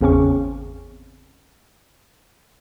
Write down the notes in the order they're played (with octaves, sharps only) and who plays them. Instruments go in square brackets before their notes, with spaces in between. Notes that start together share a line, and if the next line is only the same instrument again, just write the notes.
[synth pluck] G#1 E2 C#3 C4 C#4 C#6